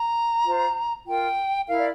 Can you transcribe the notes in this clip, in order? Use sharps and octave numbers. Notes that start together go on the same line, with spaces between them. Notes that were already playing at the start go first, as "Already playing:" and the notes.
Already playing: A#5
F4 C5
F4 A#4 G5
E4 A#4 F5
D5